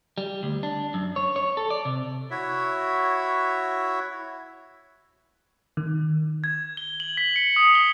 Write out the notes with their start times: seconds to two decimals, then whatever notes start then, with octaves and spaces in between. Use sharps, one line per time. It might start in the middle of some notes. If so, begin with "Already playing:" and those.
0.18 G3
0.43 D2
0.63 D4
0.94 F#2
1.16 C#5
1.36 C#5
1.57 A4
1.71 D5
1.85 C3
2.31 E4 F#4 C#5 E5
5.77 D#3
6.44 G#6
6.77 G7
7.00 F#7
7.17 B6
7.36 C#7
7.56 D#6
7.75 G7